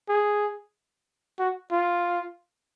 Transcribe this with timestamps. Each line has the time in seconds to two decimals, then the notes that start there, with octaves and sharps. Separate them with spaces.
0.09 G#4
1.39 F#4
1.72 F4